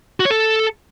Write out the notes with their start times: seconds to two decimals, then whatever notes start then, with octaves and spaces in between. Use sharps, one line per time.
0.20 F#4
0.25 C#5
0.30 A4